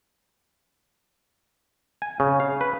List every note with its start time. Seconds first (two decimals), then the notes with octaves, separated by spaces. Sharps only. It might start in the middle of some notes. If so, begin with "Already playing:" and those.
2.02 G#5
2.20 C#3
2.40 F5
2.61 B4